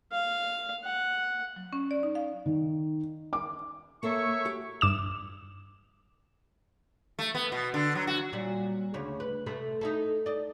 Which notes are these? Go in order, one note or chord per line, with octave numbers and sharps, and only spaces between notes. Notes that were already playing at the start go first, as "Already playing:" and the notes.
F5
F#5
F#3
C#4
D5
D#4
F5
D#3
D6
A#3 A4 C5 C#5 E5 C#6
F#4 G4
G2 D6 E7
A3
B3
B2
D3
F#3
F#4
A#2 F#3 G3
D2 C#3 C#5
B4
C3 A3 B4
D#4 E4 A4
D5 D#5